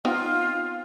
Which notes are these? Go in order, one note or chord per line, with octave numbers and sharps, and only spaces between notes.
B3 C4 D#4 F4